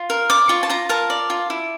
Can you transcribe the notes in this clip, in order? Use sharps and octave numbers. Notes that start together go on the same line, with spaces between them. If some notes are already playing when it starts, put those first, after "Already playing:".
Already playing: F4
A#4
D5 D6
F4 C#6
A5
F4 A#5
A#4 A5
D5
F4
E4